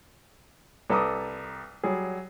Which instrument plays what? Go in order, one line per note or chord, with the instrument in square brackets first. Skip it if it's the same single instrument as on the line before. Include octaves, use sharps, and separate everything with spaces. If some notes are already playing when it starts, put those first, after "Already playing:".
[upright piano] C2 A4 B4 A#5 D6 D#6
F#3 G3 G#4